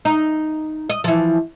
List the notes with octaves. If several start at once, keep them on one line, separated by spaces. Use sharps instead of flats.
D#4
D#5
E3 F3